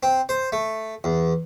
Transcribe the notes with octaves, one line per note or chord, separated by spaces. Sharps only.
C4
C5
A3
E2